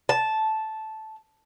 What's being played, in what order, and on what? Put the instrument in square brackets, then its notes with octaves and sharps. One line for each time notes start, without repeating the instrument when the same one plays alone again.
[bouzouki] A5